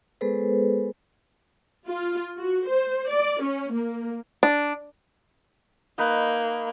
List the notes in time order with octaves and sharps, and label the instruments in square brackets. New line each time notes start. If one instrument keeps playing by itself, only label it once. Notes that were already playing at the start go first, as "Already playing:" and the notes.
[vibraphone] G#3 B3 G#4 A4 B4 C5
[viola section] F4
F#4
C5
D5
C#4
A#3
[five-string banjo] D4
[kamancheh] A#3 [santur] D#4 B4